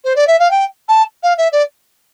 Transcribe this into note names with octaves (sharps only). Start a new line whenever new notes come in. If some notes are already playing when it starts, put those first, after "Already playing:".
C5
D5
E5
F5
G5
A5
F5
E5
D5